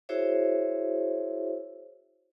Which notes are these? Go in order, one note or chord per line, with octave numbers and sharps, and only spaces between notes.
E4 F#4 G#4 C5 C#5 E5